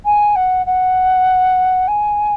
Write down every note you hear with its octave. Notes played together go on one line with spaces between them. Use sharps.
G#5
F#5
F#5
G#5